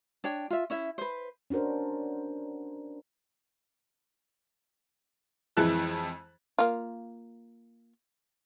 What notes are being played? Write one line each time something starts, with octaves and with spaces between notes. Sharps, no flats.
D4 C#5 G5
F4 E5
C#4 E4 E5
B4 C5
C#4 D4 F#4 A#4 C5
F2 E3 G#3 E4 A5 F#6
A#3 F4